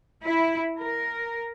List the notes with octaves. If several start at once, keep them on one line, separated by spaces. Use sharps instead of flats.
E4
A#4